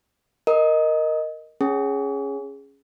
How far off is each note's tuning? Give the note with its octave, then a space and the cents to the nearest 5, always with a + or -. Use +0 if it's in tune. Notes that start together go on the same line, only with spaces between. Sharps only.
A#4 +0 D#5 +0
C#4 +0 G#4 +0